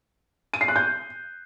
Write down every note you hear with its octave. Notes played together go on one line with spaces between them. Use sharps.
D#7
C7
F#6
G6